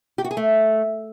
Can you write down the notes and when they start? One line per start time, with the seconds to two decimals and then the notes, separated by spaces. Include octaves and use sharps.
0.18 G4
0.24 F#4
0.31 G#4
0.37 A3